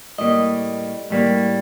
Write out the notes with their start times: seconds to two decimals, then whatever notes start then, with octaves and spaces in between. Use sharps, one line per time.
0.18 A2 G3 A#3 D#5
1.10 A2 G3 A#3